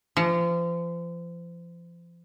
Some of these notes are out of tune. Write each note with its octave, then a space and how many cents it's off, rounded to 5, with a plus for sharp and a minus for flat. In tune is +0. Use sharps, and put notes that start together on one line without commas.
F3 -35